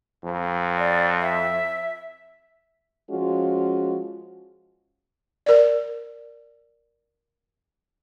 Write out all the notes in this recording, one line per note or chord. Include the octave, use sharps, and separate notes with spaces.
F2
D5
E5
F3 G#3 C#4 F4 F#4
A#4 D5